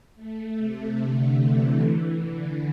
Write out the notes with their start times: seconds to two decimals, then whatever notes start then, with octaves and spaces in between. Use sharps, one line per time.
0.16 A3
0.57 C3
0.98 D3
1.40 E3
1.82 E3
2.22 D3